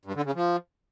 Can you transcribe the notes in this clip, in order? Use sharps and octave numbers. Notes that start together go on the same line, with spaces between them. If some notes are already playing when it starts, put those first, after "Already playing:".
G2
D3
C#3
F3